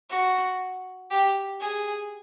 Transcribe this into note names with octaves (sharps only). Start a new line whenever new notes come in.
F#4
G4
G#4